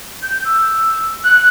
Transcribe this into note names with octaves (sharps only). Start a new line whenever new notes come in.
G6
E6
F#6